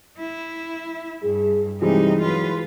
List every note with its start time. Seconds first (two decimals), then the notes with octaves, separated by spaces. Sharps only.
0.19 E4
1.23 G2 G#4
1.82 C3 E3 G3 G#3 D#4
2.21 F#3 F4 B4